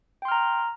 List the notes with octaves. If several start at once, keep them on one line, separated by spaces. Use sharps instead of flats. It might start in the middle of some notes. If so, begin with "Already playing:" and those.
G5 A#5 C6 F6